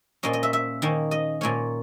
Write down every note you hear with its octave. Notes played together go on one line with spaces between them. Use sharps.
A#2 A#3 C#4 D#5
D#5
E5
E5
D#3 A#3 C#4
D#5
A#2 A#3 C#4 C#5